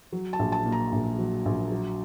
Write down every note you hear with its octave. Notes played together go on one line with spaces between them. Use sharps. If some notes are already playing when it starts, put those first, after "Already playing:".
F#3
A5
A#1
A5
A#2
A#5
A#1
F#3
A#1
F#3